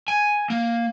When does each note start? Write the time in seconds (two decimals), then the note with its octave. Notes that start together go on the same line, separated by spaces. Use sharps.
0.08 G#5
0.50 A#3